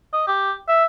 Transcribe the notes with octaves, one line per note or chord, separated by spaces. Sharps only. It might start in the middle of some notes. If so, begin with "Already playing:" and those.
D#5
G4
E5